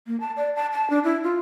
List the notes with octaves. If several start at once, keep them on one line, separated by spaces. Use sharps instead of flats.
A#3
A5
D5
A5
A5
D4
E4
F4